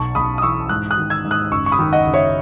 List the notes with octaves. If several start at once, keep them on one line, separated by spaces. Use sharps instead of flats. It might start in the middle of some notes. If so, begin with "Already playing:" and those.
Already playing: B1 A5 C#6
B1 B5 D#6
D#6
E3 C#6 E6
G#2 D#6 F#6
D#6 F#6
D#3
E6 G#6
G#2
D#6 F#6
F#1 C#6 E6
C#6
B5 D#6
D#3
D#5 F#5
F#1
C#5 E5